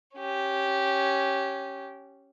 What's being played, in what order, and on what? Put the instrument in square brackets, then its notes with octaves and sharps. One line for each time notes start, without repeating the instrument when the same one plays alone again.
[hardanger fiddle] C#4 G4